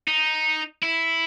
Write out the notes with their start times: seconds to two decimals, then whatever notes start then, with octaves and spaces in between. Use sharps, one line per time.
0.08 D#4
0.83 E4